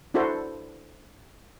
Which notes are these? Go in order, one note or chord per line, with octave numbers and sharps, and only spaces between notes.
D4 E4 F#4 A4 C5